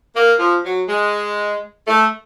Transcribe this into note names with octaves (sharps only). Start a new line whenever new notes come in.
A#3
F3
F#3
G#3
A3